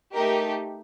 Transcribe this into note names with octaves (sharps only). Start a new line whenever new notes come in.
A3 D#4 G4 A#4